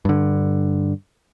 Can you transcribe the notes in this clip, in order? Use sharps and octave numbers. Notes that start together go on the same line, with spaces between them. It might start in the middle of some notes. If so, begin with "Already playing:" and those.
G2 D3